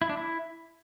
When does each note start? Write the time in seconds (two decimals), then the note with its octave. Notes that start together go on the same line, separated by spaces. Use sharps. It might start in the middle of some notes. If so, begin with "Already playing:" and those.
0.02 E4
0.09 D4
0.17 E4